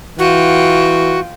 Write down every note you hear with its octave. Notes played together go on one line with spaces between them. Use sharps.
E3 F4 F#4 G5